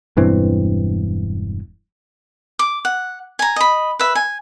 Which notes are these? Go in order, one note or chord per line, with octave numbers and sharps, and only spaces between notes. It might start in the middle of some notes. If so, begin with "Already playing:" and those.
E1 G2 E3 C4
D6
F#5
G#5 A#5
D#5 B5
B4 E5
G#5